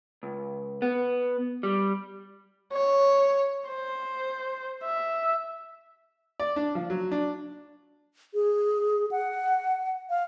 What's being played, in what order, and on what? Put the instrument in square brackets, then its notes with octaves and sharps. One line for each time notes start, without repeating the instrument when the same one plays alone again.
[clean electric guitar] C#2
B3
G3
[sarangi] C#5
C5
E5
[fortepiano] D5
D4
F3
F#3
D4
[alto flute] G#4
F#5
F5